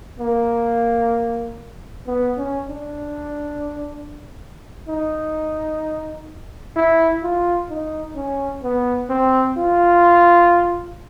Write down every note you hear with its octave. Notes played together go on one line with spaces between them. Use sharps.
A#3
B3
C#4
D4
D#4
E4
F4
D#4
C#4
B3
C4
F4